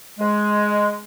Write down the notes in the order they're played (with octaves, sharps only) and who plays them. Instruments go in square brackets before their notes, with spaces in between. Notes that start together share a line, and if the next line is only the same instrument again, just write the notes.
[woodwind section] G#3